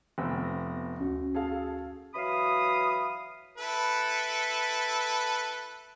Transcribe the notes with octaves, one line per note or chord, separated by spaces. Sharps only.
F1 B3 E6
A#6
D2 C#4 F#4
G#4 A4 F5
E3 F#3 F5 B5 D#6
E4 A4 B4